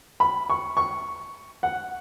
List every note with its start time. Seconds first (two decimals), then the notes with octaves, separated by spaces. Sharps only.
0.20 B5
0.50 C#6
0.77 C#6
1.63 F#5